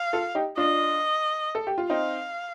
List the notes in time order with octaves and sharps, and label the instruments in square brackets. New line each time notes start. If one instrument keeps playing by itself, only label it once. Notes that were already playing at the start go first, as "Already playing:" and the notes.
Already playing: [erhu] F5
[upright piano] F4 A4
D#4 G4
[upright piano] D4 F4 [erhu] D#5
[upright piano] A4
G4
F4
[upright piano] C4 D#4 [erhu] F5